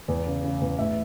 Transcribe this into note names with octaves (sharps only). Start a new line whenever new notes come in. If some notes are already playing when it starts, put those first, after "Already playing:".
E2
C#3
C#3
E2
A2 E5